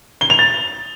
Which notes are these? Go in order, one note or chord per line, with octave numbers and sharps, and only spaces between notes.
G7
F7
A6